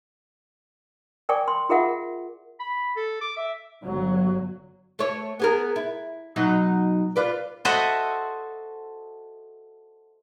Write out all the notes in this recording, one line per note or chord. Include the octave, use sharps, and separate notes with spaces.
A#4 D5 G5 G#5 C#6 D6
C6
F4 G#4 A#4 E5 F#5 D6
B5
A4
D6
E5
G1 F#3
A3 C#5
B3 G#4 A#4
E4
B2 F#3 D#4
F4 B4 D5
F#4 A4 C5 D#5 E5 F#5